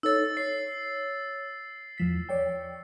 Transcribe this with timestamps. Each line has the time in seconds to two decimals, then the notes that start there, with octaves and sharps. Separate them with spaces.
0.03 D#4 A4 C#5 E6 A6
0.37 C#5 C7
1.98 E2 F3 B6
2.29 C#5 D5 G5